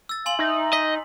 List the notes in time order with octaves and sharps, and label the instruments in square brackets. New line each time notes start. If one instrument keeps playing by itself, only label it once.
[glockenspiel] E6 A6
[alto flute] F5 [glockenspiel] G#5 C6 F#7
[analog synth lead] D#4 [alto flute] E5
[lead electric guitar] D#5 [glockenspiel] B6